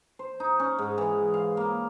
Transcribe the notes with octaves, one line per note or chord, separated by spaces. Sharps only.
C5
D#4
C#4
G#2
E3
F5
A#3